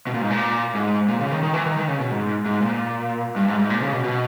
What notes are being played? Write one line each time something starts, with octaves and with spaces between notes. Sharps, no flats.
B2
A#2
G#2
A#2
G#2
A#2
C#3
D#3
D#3
E3
D#3
D#3
C#3
B2
G#2
G#2
A#2
G2
G#2
G#2
A#2
C#3
B2
B2